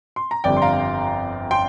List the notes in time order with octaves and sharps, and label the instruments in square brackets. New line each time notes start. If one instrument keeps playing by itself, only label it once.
[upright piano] C6
A#5
G1 F2 D3 G3 D5 G5
C6
F5 A#5
G5 C6